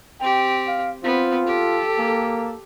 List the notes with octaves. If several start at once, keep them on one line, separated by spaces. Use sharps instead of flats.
C4 G4 G5
F5
B3 C4 F4
G4 A4
A#3